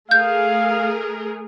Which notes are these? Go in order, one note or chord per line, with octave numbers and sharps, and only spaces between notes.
A3 G#4 A#4 F5 G6